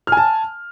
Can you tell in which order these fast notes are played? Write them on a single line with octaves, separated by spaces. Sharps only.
F6 G#5 A5